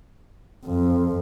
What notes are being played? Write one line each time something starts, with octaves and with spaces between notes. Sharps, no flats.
F2